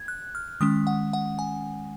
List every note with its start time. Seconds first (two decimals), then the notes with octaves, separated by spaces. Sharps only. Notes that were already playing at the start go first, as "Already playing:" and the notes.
Already playing: G#6
0.08 F#6
0.35 F6
0.61 D#3 G#3 C#4 D#6
0.87 F#5
1.13 F#5
1.39 G#5